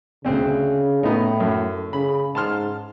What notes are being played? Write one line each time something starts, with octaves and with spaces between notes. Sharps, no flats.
D2 C#3 C4 C#4
A2 B3 D#4
F#2
C#3 B5
G#2 A5 C6 F6